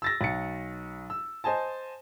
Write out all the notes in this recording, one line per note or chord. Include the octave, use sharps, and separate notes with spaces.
E6 A6 A#6
B1 A6 C#7
E6
C5 D#5 G#5 A5